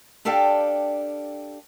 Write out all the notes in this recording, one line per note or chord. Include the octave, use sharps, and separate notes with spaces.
D4 G4 A4 D5 F5 G5